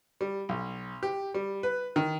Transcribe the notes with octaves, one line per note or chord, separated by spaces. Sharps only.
G3
B1
G4
G3
B4
D#3